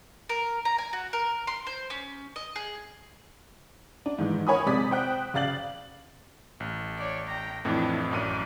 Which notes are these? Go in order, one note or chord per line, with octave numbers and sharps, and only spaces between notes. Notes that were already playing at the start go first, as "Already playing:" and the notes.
A#4
A#5
G#5
F#4
A#4
C6
C5
C#4
D#5
G#4
D4
G#2 D#3 E3 G#3
A#4 C#5 G#5 B5 D#6
C3 G#3 D5 D#6 B6
C5 G5 F#6
C#3 D5 F5 A6 F#7
A1
C#5 D5
G5 A#5
F2 A2 E3 D4 E4
A1 F#2 D5 D#7